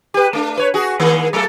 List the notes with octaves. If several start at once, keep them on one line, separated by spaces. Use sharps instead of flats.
G4 B4
A3 D4
B4 C#5
F#4 G#4
D#3 G#3 A#3
F#3 A3 A4